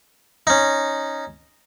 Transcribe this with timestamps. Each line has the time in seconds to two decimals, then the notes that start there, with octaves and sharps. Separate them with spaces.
0.47 C#4 D#4